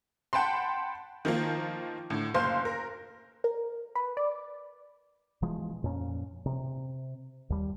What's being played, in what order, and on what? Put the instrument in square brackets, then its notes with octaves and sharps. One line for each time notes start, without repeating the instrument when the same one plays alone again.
[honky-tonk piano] F#5 G5 A5 B5 C6
D#3 F3 A#3
A2 D3
F#1 C5 F5 C6 G6
A#4
[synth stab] A#4
B4
D5
[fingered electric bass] B2 E3 F3 G#3
F2 A#2 C#4
C3
D#2 G3